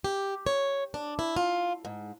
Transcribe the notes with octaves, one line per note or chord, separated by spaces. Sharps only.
G4
C#5
D4
E4
F4
G#2